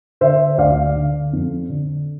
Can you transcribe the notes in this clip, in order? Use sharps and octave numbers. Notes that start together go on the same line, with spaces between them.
D3 C5 E5
D2 D5 F5
D3
F2
D3